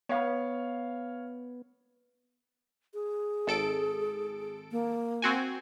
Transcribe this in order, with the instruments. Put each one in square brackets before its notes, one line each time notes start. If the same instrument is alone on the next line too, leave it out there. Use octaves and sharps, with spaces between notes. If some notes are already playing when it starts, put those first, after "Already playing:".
[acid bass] B3 [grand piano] C#5 F5
[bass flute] G#4
[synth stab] G#1 A4 D7
[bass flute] A#3
[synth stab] C4 F#4 G#5